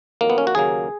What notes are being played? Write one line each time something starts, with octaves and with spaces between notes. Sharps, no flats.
F2 D#3 F#3 A#3
B3
C#4
F#4
D#2 C#3 F#3 A#3 G#4